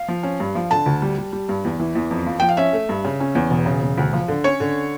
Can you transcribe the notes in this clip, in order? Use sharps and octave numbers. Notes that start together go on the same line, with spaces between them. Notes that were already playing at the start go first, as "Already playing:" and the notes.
Already playing: F5
F3
C#4
G2
F3
D3 A5
D2
G3
G3
G3
G2
E2
E3
E2
F2
F3
F3 G5
F5
C#4 E5
A3
G2
C#3
C#4
E2
E1
C#3
E1
D2
F3
D3
C#4 C#5
D3